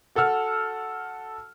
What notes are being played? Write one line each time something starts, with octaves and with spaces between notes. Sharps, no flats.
F#4 A4 F#5 E6 F6